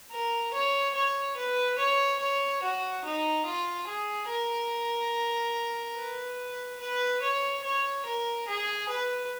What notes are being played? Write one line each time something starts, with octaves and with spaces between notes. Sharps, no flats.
A#4
C#5
C#5
B4
C#5
C#5
F#4
D#4
F4
G#4
A#4
B4
B4
C#5
C#5
A#4
G#4
B4